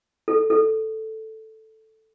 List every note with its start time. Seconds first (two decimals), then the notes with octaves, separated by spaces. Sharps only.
0.28 A4
0.50 A4